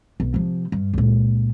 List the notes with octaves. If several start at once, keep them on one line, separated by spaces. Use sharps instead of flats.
B1
C3 F3
G2
C#2 A#2